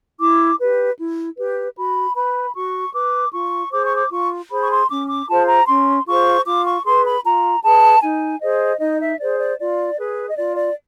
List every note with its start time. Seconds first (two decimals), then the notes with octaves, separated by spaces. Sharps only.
0.19 E4 D6
0.59 G4 B4
0.98 E4
1.37 G4 B4
1.76 F#4 B5
2.15 B4 B5
2.54 F#4 C#6
2.93 B4 D6
3.33 F4 C#6
3.72 G#4 C5 D6
3.85 C#6
3.97 D6
4.10 F4 C#6
4.51 G#4 C5 B5
4.62 C#6
4.70 C6
4.90 C#4 D6
5.09 D6
5.28 F4 G#4 C5 A5
5.48 A#5
5.68 C#4 C6
6.07 F4 G#4 C5 C#6
6.46 F4 D6
6.66 C#6
6.85 G#4 B4 C6
7.05 B5
7.24 F4 A#5
7.63 G#4 B4 A5
8.03 D#4 G#5
8.41 G#4 C5 D#5
8.80 D#4 D#5
9.01 E5
9.20 G#4 C5 D5
9.40 D5
9.59 F4 D5
9.99 G#4 B4
10.28 D#5
10.37 F4 D5
10.57 D5